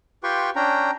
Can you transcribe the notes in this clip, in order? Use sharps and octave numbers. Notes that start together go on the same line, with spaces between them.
F4 G4 B4 G5 C6 C#6
C#4 D4 G5 A#5